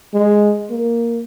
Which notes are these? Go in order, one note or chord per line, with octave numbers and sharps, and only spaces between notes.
G#3
A#3